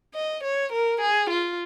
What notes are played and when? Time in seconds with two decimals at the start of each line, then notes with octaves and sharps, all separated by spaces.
0.15 D#5
0.43 C#5
0.72 A#4
1.01 G#4
1.30 F4